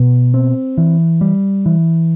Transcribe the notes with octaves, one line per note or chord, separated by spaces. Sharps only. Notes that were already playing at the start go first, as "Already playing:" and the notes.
Already playing: B2
C4
E3
G3
E3